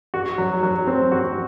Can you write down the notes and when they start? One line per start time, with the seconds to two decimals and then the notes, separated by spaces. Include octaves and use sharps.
0.14 F#4
0.38 F#3
0.63 F#3
0.87 C4
1.12 F#4